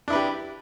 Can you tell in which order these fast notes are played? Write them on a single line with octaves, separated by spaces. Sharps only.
D4 E4 B4 G4